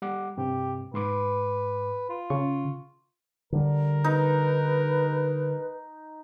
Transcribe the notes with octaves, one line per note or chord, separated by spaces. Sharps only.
G3 F#5 D6
G2 C3 G4
G#2 B4 C6 D6
F4
C#3 C#6
D3 G3 A#4
D#4 B4